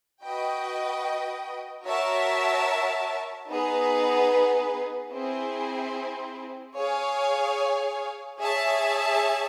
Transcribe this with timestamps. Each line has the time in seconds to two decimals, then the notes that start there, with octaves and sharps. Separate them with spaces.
0.24 F#4 B4 D#5 G5
1.86 F#4 A#4 C#5 E5 A5
3.49 B3 D#4 G#4 B4
5.13 C4 E4 G#4
6.76 G#4 C#5 F5 G#5
8.39 G#4 C#5 E5 A5